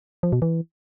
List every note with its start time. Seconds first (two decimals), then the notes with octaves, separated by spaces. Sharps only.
0.23 F3
0.33 B2
0.42 E3